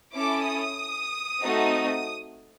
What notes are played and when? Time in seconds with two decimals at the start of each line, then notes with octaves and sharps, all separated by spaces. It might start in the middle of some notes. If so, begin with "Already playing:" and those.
0.14 C#4 E4 A4 D6
0.46 D#6
1.41 A3 C4 D#4 F#4